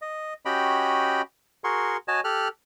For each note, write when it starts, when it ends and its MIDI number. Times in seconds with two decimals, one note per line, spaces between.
0.02 0.34 75
0.46 1.22 61
0.46 1.22 66
0.46 1.22 67
0.46 1.22 75
0.46 1.22 79
0.46 1.22 83
1.64 1.97 66
1.64 1.97 68
1.64 1.97 70
1.64 1.97 84
1.64 1.97 85
2.08 2.20 66
2.08 2.20 73
2.08 2.20 75
2.08 2.20 80
2.08 2.20 81
2.24 2.48 67
2.24 2.48 69
2.24 2.48 89
2.24 2.48 90